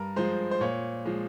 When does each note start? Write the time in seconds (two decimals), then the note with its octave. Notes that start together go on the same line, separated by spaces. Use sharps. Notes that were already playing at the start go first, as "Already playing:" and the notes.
Already playing: G2 A#4
0.16 F3 G#3 C5
0.51 C5
0.61 A#2 C#5
1.05 F3 G#3